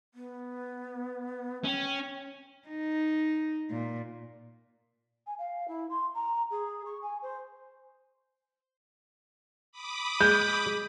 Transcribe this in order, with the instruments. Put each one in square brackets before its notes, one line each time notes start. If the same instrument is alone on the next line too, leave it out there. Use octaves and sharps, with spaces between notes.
[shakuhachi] B3
[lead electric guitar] C#4 [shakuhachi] G5
[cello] D#4
A#2
[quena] G#5
F5
E4
C6
A#5
G#4
C#6
G#5
C5
[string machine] B5 D6 D#6
[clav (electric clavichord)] G#3 [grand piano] G6